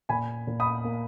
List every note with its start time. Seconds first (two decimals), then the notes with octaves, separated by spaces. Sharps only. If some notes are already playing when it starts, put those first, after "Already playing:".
0.09 A#2 G#5 B5
0.47 A#2
0.60 B5 D#6
0.84 A#3